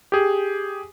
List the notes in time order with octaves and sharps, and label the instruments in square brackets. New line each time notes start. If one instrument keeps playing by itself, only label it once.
[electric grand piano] G4 G#4